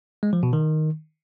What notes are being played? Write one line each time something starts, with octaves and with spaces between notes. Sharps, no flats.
G#3
F3
B2
D#3